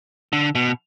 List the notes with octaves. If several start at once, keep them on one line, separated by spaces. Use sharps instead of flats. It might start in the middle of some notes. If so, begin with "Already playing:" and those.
D3
B2